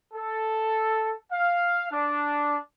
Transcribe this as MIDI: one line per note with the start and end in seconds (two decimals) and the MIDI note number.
0.14 1.13 69
1.32 1.91 77
1.91 2.57 62